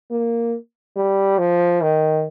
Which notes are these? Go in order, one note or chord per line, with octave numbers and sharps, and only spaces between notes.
A#3
G3
F3
D#3